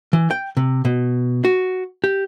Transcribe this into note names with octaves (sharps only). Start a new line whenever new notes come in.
E3
G5
C3
B2
F#4
G4